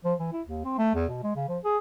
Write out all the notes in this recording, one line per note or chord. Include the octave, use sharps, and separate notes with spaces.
F3
E3
E4
D#2
C4
A3
E2
B2
G#3
C#3
F3
G#4